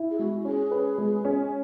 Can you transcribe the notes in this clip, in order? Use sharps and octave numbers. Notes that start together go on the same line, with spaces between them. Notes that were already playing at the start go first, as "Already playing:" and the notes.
Already playing: E4
G#4
G#3 F#4
C#4 G#4
B4
G#3
C#4